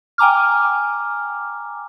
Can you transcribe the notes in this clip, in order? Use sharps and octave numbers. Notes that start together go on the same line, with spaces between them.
G5 G#5 A#5 D6 F6